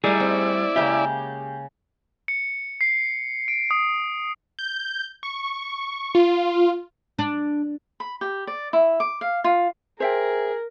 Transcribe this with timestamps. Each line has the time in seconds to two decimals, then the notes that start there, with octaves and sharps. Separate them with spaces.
0.04 G3 A3 D#4 E4 G#4 A#4 D5 G#5
0.20 C4
0.76 C#3 G#3 A#3 G4 E5
2.28 C#7
2.81 C7
3.48 D7
3.71 D#6
4.59 G6
5.23 C#6
6.15 F4
7.19 D4
8.00 B5
8.21 G4
8.47 D5
8.73 E4
9.00 D6
9.21 F5
9.44 F4
10.00 G#4 A#4 C5 E5 G5